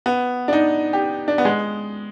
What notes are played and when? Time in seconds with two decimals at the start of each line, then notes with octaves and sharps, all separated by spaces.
0.06 B3
0.48 D4
0.53 D#4
0.93 G4
1.28 D4
1.38 B3
1.45 G#3